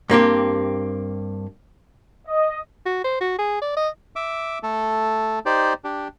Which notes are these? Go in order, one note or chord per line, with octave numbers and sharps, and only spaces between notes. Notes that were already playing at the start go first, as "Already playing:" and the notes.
G2 A#3 C4 G4
D#5
F#4
C5
F#4
G#4
D5
D#5
E5 D6
A3 A4
D#4 G4 C5 D5
D4 G4